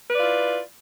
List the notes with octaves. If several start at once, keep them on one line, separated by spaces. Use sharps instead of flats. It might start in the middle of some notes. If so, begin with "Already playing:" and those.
E4 F4 B4 D5